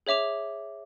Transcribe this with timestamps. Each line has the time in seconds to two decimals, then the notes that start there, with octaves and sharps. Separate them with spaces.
0.07 G#4 C#5 E5 D6 F7